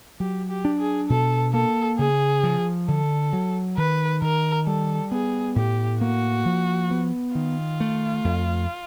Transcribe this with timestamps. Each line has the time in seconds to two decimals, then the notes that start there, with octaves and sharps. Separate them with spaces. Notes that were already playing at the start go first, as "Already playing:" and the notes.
0.20 F#3 G4
0.49 G4
0.65 D4
0.79 G#4
1.09 B2 A4
1.53 A#3 A4
1.98 C#3 G#4
2.43 F3
2.88 D3 A4
3.33 F#3
3.77 D#3 B4
4.22 D#3 A#4
4.66 G3 A4
5.11 B3 G#4
5.56 A2 G4
6.01 A#3 F#4
6.45 F3
6.90 B3
7.35 D#3 F4
7.80 A3
8.24 F2